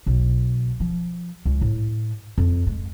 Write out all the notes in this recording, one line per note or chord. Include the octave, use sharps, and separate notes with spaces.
B1
F3
C#2
A2
F2
G#3